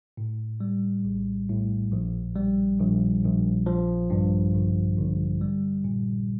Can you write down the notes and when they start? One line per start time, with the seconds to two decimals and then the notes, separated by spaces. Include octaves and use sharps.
0.17 A2
0.60 G3
1.05 A#1
1.49 A2
1.93 A#1
2.36 G3
2.79 A#1
3.24 A#1
3.66 F3
4.10 G2
4.55 G1
4.98 G1
5.41 G3
5.84 A#2